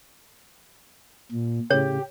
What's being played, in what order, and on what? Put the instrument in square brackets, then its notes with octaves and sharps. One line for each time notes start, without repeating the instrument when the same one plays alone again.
[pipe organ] A#2
[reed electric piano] A2 C#3 [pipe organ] G4 [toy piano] C#5